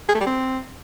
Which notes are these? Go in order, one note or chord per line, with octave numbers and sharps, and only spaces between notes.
G#4
A3
G3
C4